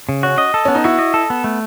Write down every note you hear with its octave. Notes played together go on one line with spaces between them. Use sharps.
C#3
C#4 F#4
D#5
A4
B3 C#4
D#4
E4 F#4
D#5
A4
B3
A3